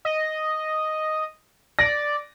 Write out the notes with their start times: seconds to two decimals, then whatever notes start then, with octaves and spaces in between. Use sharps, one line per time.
0.05 D#5
1.79 D5 A#6